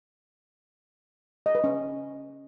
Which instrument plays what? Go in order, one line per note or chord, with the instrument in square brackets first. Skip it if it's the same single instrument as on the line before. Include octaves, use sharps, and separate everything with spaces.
[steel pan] D#5
B4
C#4